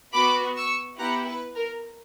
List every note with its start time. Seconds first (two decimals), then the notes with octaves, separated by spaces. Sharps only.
0.14 B3 F#4 B5 D6
0.56 C#6 E6
0.98 B3 E4 G4 F#5 A#5
1.27 B4
1.55 A#4